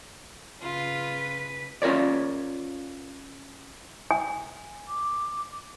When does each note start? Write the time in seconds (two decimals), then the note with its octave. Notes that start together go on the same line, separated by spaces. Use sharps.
0.62 C#3 F4 B4
1.82 C#4 F4 A#4 C#5 D5
4.11 G#5
4.88 D6